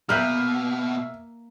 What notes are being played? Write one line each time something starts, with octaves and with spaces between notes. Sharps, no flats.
B2 A#3 B4 E5 G5 F6